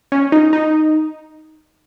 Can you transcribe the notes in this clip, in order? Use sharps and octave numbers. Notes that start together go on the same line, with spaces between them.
C#4
D#4
D#4